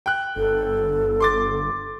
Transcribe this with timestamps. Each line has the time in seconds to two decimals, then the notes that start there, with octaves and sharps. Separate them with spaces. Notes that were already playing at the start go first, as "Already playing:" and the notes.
0.06 G5 F#6
0.36 G1 A4
1.20 C6 D6 A6